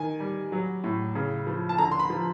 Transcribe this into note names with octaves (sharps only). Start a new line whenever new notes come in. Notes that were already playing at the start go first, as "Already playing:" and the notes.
Already playing: D#3 G#5
G3
F#3
A2
C#3
F3
A5
D3 A#5
C6
B5
F3